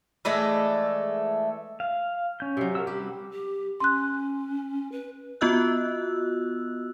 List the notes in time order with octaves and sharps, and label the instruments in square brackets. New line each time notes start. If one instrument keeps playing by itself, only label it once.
[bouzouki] E3 G#3 A3 D5
[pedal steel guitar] F5
C#4 G6
[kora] C3 F#3
[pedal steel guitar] A#4 F#5 E6
[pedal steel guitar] G3 F#4 [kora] G4
[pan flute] G4
[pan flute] C#4 [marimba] C6 F#6
[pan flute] B4
[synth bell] B3 F4 F#4 D#5 E6 F#6